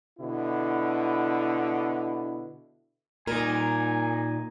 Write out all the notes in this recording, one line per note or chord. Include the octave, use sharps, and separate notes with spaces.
B2 D3 E4
A#2 D#4 A#4 G#5